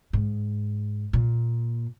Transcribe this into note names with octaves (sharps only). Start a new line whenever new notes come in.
G#2
A#2